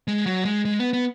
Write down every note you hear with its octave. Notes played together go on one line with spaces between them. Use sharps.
G#3
F#3
G#3
G#3
B3
B3